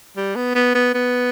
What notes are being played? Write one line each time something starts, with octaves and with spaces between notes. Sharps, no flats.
G3
B3
B3
B3
B3